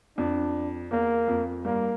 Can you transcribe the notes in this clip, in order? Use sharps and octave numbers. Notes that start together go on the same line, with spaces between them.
F2 D4
E2 A#3
F2
G2 A#3